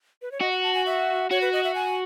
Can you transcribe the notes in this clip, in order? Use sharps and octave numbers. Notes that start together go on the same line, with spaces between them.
B4
C#5
F#4 D#5
F#5
A5
G#5
E5
F#4 C#5
B4
D#5
E5
G#5